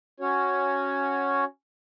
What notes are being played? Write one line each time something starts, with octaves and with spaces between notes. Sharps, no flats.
C#4 F#4 C#5